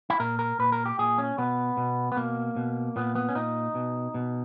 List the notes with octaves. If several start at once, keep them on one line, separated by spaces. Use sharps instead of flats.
E4
A#2 A#4
A#4
A#2 B4
A#4
G4
A#2 G#4
C#4
B2 B3
B2
B3
B2 A#3
B2
A#2 B3
B3
C#4
A#2 D#4
B2
B2